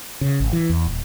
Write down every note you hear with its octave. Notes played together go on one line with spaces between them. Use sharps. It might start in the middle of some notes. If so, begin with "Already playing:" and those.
C#3
G#1
E3
E2
D#1